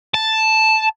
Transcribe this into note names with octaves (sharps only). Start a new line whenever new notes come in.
A5